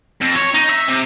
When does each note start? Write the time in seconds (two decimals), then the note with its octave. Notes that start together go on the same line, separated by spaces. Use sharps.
0.21 F2
0.36 C#5
0.54 D#4
0.69 E5
0.88 C3